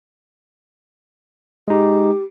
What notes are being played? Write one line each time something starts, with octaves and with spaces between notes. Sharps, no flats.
G#3 D#4 G4